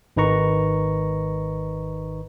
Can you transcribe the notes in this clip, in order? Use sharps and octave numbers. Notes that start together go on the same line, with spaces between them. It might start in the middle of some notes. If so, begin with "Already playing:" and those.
G#1 D#3 D#4 B4 A#5 C#6